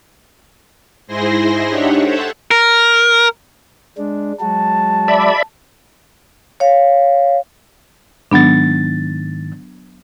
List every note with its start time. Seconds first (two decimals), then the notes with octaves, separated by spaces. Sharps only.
1.07 G#2 E4 G#4 C5 C6 A#6
1.67 D4 D#4 G4 C#5 E5 F#5
2.02 A4 C5 C#5 E5 F#5 A5
2.51 A#4
3.98 G#3 D4
4.41 F#3 G#3 F#4 A5
5.08 D5 E5 B5
6.60 C#5 F5
8.32 G#2 D#3 F#3 B3 D4 A6